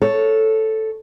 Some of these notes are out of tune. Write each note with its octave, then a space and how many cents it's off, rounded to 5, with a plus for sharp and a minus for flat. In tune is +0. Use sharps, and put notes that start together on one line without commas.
A4 +0 C#5 +0